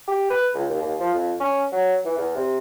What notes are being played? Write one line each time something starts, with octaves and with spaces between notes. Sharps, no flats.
G4
B4
C#2
D#2
D#2
F3
F2
C#4
F#3
E3
E2
C3